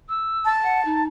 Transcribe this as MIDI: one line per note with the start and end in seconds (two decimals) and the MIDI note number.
0.08 0.51 88
0.44 1.03 81
0.62 0.80 78
0.84 1.06 63